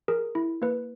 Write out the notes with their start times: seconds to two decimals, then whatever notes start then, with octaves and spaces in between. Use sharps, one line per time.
0.08 G#4 A#4
0.35 E4
0.62 A#3 B4